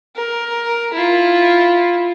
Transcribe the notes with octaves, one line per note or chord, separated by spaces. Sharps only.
A#4
E4 F4